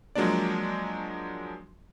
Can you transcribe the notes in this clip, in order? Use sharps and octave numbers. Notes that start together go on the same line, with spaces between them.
F3 F#3 G#3 A#3 D4 D5